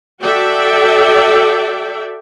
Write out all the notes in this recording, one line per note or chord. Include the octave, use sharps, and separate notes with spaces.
F#4 A4 D5 E5 G5